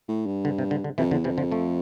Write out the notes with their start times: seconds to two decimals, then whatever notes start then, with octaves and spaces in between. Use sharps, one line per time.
0.08 A2
0.26 G2
0.45 D3
0.58 C3
0.71 D3
0.84 D3
0.98 F2 C3 E3
1.11 E2 D3 F3
1.24 F2 C3 E3
1.38 D3 F3
1.51 F3 A3